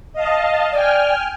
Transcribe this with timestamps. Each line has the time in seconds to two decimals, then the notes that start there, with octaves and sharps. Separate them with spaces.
0.13 D#5 F5 A5
0.72 D5 G5 G#5 F6